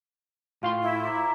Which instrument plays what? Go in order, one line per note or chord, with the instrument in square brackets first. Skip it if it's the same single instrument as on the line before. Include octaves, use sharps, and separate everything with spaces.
[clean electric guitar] A2 F5 C6 [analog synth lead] F4 [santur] G5
[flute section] E4
[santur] C5 D5 A#5